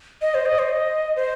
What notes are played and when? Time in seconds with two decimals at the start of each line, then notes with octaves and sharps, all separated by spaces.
0.22 D#5
0.35 C5
0.46 D#5
0.59 C5
0.70 D#5
1.16 C5